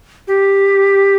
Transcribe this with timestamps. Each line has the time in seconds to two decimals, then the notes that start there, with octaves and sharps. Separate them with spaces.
0.27 G4